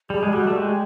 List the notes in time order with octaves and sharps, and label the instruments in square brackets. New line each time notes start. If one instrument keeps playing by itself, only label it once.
[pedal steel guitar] G3 [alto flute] G#4
[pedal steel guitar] G#3
[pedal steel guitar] G3 [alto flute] F#4
[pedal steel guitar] A3
[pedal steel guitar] G#3 [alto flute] G4